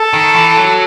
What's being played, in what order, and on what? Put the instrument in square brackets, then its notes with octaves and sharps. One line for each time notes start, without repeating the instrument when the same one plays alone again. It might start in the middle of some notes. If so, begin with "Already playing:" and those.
Already playing: [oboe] A4
[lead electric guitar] D#3
E3
F#3